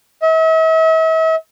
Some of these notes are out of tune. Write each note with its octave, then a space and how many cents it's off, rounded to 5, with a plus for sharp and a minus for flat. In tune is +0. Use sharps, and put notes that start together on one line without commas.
E5 -45